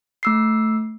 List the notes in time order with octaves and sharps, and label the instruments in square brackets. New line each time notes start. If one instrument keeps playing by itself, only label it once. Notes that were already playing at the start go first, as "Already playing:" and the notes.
[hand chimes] A3 E6 C7